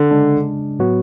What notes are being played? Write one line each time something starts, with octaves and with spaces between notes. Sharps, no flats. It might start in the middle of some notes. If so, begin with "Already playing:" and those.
Already playing: D3
C#3 G#3 D4
A2 F#3 B3 F#4